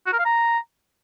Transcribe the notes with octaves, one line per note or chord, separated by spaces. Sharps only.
F#4
A#4
F5
A#5